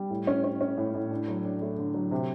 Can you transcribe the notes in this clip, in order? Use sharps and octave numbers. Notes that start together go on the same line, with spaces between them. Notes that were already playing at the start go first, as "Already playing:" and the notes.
Already playing: G3
A2
C#4
C#4
C#4
A2
A2
D4
F#3
D4
A3
D3
F#3
C3